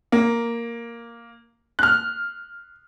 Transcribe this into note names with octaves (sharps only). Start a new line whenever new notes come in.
A#3
F6 F#6